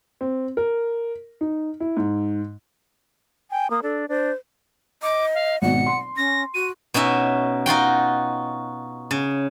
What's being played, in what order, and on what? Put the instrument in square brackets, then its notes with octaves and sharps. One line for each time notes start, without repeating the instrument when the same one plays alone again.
[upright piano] C4
A#4
D#4
E4
G#2
[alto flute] G5 [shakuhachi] G#5
[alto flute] A#3 [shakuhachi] D#6
[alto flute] D4 [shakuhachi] A4
[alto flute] D4 [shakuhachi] C5
[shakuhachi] D#5 [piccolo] D6
[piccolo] F5
[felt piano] G#1 B2 [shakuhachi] F#5 [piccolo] C#7
[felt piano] C6
[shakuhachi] C#4 [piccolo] A#6
[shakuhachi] F#4 [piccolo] D#7
[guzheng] B2 C#4 D#4 E5
D#4 F4 F#4 G5
C#3